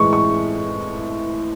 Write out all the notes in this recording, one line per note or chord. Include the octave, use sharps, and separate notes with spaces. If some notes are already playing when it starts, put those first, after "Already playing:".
Already playing: A2 E3 G#3 C#6
C#6